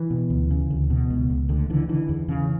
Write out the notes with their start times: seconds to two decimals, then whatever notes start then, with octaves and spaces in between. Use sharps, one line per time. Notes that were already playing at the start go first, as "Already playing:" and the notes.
Already playing: E3
0.10 B2
0.30 D2
0.50 C#3
0.70 D2
0.90 B2
1.10 C#2
1.30 C#2
1.49 D2 D3
1.70 D3 E3
1.89 D3 E3
2.09 E2
2.28 C#3